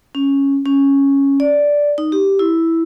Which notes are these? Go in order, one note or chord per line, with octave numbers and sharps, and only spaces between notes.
C#4
C#4
D5
D#4
G4
E4